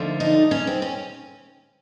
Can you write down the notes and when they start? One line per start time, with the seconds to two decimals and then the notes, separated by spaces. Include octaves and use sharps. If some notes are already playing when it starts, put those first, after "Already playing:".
Already playing: D#2 D3 F3 A3
0.20 D#4
0.51 C#4
0.67 C4
0.82 C#4